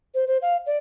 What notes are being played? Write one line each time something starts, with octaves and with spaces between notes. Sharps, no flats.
C5
C5
F5
D5